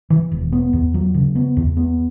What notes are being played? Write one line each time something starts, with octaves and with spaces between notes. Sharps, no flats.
E3
E1
B3
E2
F#3
C#3
B3
E2
B3